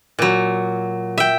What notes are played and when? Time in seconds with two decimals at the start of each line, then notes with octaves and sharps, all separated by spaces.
0.19 A#2 F#3
1.18 E5 G5